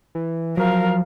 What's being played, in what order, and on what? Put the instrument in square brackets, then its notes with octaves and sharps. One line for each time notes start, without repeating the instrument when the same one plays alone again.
[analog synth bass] E3
[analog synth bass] F3 [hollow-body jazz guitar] F#3 [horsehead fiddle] A#4 F5